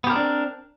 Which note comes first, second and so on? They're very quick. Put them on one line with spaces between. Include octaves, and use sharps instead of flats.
B3 G4 A#4 C4 D4